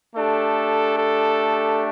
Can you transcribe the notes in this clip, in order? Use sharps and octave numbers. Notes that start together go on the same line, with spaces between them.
A3 D4 G4 A4
A4